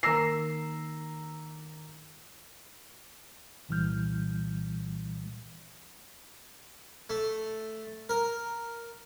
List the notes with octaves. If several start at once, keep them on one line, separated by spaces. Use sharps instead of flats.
D#3 A#3 A#5 E6 A#6 C7
C2 A#2 E3 G3 F6 G6
A3
A#4